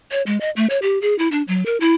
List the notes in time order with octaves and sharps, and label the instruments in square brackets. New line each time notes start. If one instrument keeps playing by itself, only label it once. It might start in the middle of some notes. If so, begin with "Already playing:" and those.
[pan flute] C#5
G#3
D#5
A3
C#5
G4
G#4
E4
D4
F#3
A#4
E4